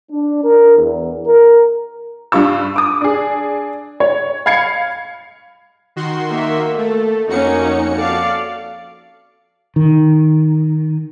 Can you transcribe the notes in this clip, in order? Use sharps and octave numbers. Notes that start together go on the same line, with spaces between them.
D4
A#4
E2
A#4
G2 G3 F4 C#6 E6
D6 D#6
D4 G#4
C#5
F5 B5 G#6 C7 C#7
D#3 F#4 C6
A#3 E5
A3 A4
F2 A#3 C#4 D#4 F#4 C#7
A4 D5 F5
D#3